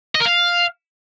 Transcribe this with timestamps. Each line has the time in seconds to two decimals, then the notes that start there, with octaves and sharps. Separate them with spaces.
0.15 D#5
0.21 A#4
0.26 F5